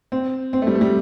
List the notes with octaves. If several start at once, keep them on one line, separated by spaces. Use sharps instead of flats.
C4
C4
A3
G3
A3
G3